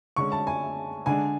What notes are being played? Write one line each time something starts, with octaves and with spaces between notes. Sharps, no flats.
D3 G#3 C#4 C#6
A5
G#5
D3 G#3 D4 G#5